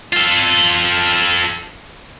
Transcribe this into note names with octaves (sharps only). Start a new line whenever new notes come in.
F4 A4